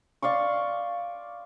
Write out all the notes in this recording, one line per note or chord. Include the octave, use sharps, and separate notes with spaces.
D5 F5 C6 C#6